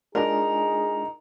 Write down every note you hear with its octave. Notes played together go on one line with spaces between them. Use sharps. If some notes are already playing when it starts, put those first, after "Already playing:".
G#3 D4 D#4 F4 G#4 A#4